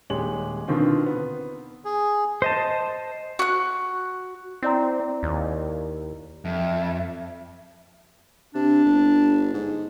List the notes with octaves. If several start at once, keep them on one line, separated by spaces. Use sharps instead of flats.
D#1 G#3 G4 C#5 F#7
B2 D3 D#3 C4 F4
B3
G#4
C5 D#5 A5
F#4 F#6
C4 E4 D5 A#5
D#2
F2 E5
C3 D4
G1
G#2